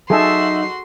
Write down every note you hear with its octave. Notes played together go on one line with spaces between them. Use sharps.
F#3 D#4 F#4 G#4 A4 E5 C6